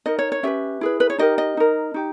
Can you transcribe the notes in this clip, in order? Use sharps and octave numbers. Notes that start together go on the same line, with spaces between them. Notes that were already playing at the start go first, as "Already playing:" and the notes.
D#4 A#4 D#5
C#5
C#5
C#4 G4 B4 E5
E4 G#4 B4
B4
C#5
D#4 G4 A#4 D#5
D#5
D#4 A#4
D#4 G4